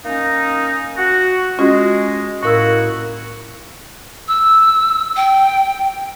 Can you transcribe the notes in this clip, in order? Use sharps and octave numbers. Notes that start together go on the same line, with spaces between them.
A#3 C#4 D#4
F#4
G#3 C#4 F4 F#4
A2 A#3 E4 F#4 A#4 E6
E6
G5